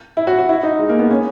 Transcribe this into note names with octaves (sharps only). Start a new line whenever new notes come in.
E4
F#4
F#4
E4
D#4
G#3
A#3
B3
C#4